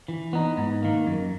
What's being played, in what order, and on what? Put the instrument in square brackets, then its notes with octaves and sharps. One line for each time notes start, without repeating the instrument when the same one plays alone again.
[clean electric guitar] E3
B3 D#4
G#2
D#3 A#3
F#2